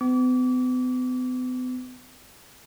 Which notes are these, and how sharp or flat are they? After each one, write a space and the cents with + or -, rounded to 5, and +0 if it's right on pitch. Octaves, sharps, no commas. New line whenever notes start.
B3 +40 D6 -30